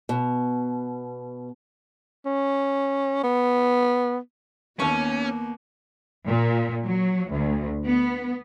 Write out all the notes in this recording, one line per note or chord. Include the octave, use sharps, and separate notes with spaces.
B2
C#4
B3
D#2 A#3 B3 C#4 C#6
A#2
F#3
D2
B3